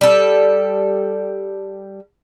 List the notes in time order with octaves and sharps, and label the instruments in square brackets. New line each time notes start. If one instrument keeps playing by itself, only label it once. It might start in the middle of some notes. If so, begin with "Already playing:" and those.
[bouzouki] G3 A4